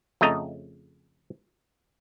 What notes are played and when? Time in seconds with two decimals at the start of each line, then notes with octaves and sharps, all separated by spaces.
0.21 F2 C#3 A3 D#5 A#5